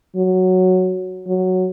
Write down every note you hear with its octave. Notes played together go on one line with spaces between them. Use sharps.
F#3
F#3